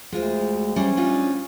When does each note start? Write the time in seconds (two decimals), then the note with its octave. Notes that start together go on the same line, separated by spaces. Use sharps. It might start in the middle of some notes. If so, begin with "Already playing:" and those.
0.12 D2 G#3 F4 C5
0.76 G3 C#4 D4 C5
0.97 D4 D#4 F4